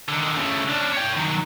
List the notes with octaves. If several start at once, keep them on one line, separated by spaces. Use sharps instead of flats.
D3 D#3
C#3 A3
C#4 D4
C#5 G5
D#3 F#3